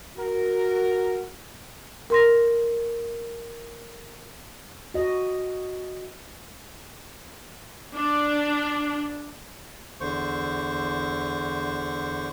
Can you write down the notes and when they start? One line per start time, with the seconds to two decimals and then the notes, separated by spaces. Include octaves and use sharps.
0.18 F#4 A#4
2.10 A#4 C6 A#6
4.94 F#4 D#5
7.95 D4
10.01 E2 D3 C5 C#6